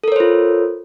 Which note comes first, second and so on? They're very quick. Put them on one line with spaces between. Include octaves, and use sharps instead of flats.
A4 A#4 C#5 C5 F4